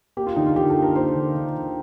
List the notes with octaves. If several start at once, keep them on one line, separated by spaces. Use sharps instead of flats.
A#3 G4
F4
D3 D#4
F4
D3 G4
A4
A#3
A#4
A#3 C5
D3
D3
D3